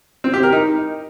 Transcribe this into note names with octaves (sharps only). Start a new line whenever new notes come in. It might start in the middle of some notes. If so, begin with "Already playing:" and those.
C4
G4
A#4
D#4